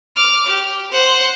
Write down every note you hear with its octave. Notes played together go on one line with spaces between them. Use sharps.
D6 F6
G4
C5 F#5